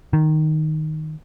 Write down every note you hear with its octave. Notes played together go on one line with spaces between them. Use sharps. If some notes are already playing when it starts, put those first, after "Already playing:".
D#3